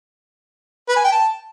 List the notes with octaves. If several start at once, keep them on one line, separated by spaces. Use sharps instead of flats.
B4
G#5
G5
A5